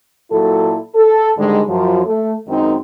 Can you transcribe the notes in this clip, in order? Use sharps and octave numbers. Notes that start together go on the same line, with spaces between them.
A#2 F#3 E4 A4
A4
G#2 D3 D#3 G3 G#3
F#2 F3 F#3
A3
F#2 D#3 G#3 C4 D#4